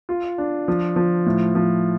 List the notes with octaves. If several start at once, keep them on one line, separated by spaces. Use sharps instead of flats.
F4
D4
F3
F3
A2
F3